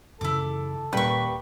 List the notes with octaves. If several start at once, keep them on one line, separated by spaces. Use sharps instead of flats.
F#2 C#3 E3 E4 A4 D6
D#1 A#2 G3 A#3 C#4 B4 C#6